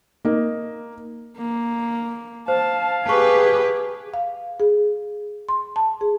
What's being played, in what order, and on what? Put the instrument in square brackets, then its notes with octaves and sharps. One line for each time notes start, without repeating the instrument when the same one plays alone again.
[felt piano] A#3 D#4
[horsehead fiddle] A#3
[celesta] C5 [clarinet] F5 [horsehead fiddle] A5
[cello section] G4 B4 [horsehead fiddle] G#4 [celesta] A5 C#6
[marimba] F5
G#4
C6
A5
G#4